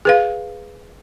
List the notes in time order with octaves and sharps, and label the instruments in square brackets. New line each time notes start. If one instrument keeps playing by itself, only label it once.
[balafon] G#4 B4 F5